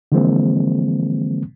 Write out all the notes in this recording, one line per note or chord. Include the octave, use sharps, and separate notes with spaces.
D3 E3 F3 G#3 A#3 C4